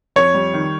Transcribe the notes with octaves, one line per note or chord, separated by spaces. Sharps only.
F2 C#5
G3
D#3